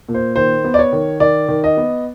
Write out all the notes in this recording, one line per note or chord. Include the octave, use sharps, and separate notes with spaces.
A#2
C5
D#3 C5
B3
D5
C#5
D#3
D#3 D5
D#3
D#5
B3